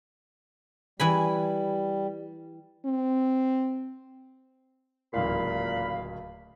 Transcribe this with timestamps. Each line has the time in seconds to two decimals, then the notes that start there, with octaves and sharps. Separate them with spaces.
1.00 E3 G3 G#5 B5
2.86 C4
5.14 D1 C#2 A#2 E3 F5 B5